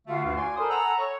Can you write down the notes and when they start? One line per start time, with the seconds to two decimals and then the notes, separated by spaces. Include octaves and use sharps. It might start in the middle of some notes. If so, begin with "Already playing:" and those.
0.06 D3 A3 F4 F#4 F5
0.23 D2 G2
0.37 D5 G#5 C6
0.57 A4 A#4 C5 G#5 B5 D#6
0.69 F#5 A#5 E6
0.98 C#5